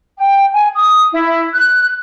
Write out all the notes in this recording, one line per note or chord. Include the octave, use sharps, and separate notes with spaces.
G5
G#5
D#6
E4
F#6